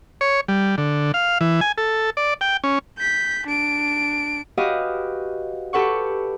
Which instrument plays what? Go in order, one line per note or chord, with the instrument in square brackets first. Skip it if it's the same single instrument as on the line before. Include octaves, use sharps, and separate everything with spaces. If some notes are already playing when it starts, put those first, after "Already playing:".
[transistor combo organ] C#5
G3
D3
F5
E3
G#5
A4
D5
G5
C#4
[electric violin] G6 B6
D4 D7
[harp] F#4 G4 B4 D#5 F5
G4 A4 B4 F#5 C#6